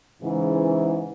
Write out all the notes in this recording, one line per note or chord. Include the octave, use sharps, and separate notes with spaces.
G#2 C#3 E3